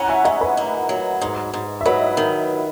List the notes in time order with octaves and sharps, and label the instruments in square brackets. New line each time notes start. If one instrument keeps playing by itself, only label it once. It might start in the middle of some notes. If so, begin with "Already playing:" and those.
Already playing: [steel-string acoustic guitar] E3 C#4 [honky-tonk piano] F#5 A#5
[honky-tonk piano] E5 G#5
[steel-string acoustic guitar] G#2 [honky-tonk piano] D#5 F#5
[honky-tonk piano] B4 D#5
[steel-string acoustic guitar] A#3
F#3
G#2
G#2
[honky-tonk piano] E5
[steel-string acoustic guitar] F#3 [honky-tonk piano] B4 D#5
[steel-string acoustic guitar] D#3